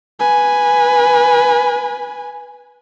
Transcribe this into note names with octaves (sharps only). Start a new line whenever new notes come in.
B4 G#5